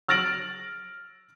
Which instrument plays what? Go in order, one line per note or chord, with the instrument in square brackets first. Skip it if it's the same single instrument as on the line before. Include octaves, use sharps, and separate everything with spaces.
[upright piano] E6 F6 A6 A#6 D7 F#7